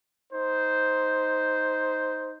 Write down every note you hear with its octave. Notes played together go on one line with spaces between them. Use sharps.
D#4 C5